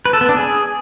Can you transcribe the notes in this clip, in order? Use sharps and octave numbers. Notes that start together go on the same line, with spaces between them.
B4
A4
B3
D4
G#4